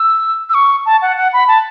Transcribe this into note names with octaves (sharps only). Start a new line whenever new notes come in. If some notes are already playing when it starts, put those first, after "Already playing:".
Already playing: E6
E6
C#6
A5
F#5
F#5
B5
A5